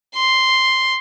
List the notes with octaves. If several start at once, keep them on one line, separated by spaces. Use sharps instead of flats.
C6